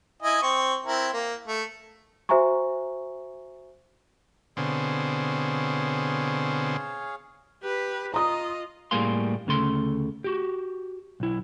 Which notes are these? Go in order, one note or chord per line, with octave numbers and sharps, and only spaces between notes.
E4 D#5 G#5
C4 C6 C#6
C4 E4 A#4
A#3
A3
F#4 C5 E5 G#5 A#5 C#6
B2 D3 C4 G#4 C#5 F5
G4 B4
F4 D#5 A#5 D#6
A2 G3 A#3 G#4 F5 C6
D2 C#3 A3 C6
F#4 G4
B1 E4